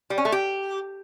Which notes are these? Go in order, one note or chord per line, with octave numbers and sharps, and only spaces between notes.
G3
C#4
A3
G4